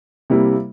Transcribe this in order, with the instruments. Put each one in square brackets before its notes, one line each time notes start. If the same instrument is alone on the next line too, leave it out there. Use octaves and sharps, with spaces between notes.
[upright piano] C3 G3 A#3 E4